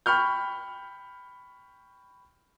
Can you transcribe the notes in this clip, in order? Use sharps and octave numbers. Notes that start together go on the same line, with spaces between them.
G5 B5 C#6 F6 G6